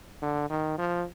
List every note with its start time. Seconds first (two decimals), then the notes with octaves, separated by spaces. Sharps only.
0.22 D3
0.50 D#3
0.78 F3